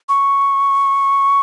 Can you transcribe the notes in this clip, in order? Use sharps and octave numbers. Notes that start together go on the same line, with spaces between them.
C#6